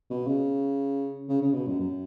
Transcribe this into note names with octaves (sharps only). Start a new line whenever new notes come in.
B2
C#3
C#3
C#3
B2
F#2
F#2